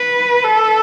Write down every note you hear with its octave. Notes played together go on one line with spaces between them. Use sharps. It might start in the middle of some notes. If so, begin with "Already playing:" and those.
Already playing: B4
A4